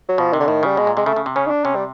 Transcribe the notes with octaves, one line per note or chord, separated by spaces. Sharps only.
F#3
B2 F3
C3 D#3
D3
A2 D#3
C#3 G3
B2 G#3
A#2
C3 G#3
C#3 A3
C#3
C3
C#3 C#4
D#4
D4
C3 C#4
G3